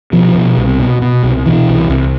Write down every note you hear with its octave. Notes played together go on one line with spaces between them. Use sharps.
B2 F3
B2
C2
B2
B2
C2
B2 E3
C2
C2